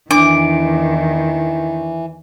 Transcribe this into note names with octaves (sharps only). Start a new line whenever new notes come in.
E2 D#3 E3 D4 D6